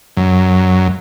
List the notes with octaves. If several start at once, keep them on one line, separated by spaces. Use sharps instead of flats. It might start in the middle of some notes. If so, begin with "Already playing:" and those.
F#2